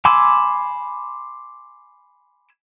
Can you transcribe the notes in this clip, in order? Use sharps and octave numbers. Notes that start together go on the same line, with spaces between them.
G#5 B5 C6 D6 E6